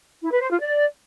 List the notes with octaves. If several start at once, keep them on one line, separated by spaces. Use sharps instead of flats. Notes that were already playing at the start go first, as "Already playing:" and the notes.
E4
B4
C5
F4
D5